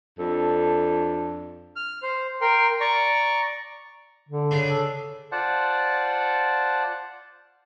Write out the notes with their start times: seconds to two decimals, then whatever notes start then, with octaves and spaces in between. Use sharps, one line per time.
0.18 F2 D4 A4
1.76 F6
2.03 C5
2.41 A#4 G5 C6
2.80 D5 A#5 C#6
4.29 D3
4.51 C#3 D4
4.69 A4
5.32 F4 C5 D5 F#5 A5